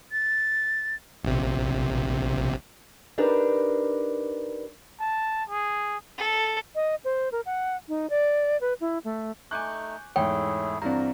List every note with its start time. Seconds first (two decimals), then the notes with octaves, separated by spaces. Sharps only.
0.11 A6
1.24 A#1 C3
3.18 D4 D#4 G4 A#4 B4
5.00 A5
5.49 G#4
6.17 A4
6.75 D#5
7.05 C5
7.32 A#4
7.46 F#5
7.88 D#4
8.10 D5
8.61 B4
8.81 E4
9.04 A3
9.51 A3 D#4 G#5 C#6 D6 F#6 G6
10.16 E2 G#2 A3 E4 G#4 C#5 G5
10.82 G2 E3 C4 D4 A#4 A#5